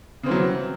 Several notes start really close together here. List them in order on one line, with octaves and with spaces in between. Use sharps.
C#3 C4 E3 F#3